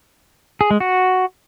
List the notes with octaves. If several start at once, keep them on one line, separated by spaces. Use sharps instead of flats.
G#4
G#3
F#4